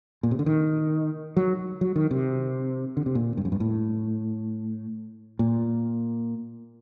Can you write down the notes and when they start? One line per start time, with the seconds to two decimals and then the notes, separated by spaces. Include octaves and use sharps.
0.23 A#2
0.31 C3
0.39 D3
0.46 D#3
1.37 F#3
1.81 F#3
1.96 D#3
2.11 C3
2.97 D3
3.06 C3
3.15 A#2
3.37 G2
3.45 F#2
3.52 G2
3.60 A2
5.39 A#2